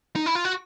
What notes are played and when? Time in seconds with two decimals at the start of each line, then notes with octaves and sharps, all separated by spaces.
0.16 D#4
0.26 E4
0.35 F4
0.45 F#4